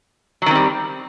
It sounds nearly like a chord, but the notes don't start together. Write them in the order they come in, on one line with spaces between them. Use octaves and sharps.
F#3 D#3 C4 G3